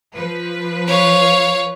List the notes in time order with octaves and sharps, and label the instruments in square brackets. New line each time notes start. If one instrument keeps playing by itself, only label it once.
[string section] F3 B4
[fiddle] C#5 F5